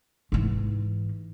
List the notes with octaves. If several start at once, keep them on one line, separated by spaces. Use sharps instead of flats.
G#2 E3